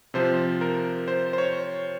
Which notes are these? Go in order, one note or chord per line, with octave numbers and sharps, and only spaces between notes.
C3 F3 C5
A#4
C5
C5
C#5